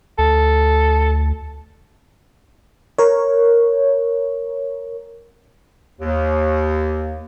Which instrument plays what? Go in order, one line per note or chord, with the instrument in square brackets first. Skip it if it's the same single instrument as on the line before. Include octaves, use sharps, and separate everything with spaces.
[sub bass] D2 [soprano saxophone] A4
[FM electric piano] A#4 C#5
[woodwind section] D#2